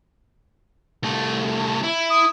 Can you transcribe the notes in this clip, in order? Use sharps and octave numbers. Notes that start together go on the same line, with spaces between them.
C2 A3
E4
D#6